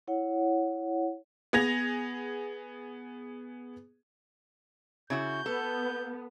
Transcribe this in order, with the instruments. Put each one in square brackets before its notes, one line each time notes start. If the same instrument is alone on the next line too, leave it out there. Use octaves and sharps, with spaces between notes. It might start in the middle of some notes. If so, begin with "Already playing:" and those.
[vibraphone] E4 C#5 F#5
[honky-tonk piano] B3 G#4 G#6 A#6 F7
[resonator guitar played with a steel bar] C#3 E4 F#4 [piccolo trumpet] G6
[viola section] B3 [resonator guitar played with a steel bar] A4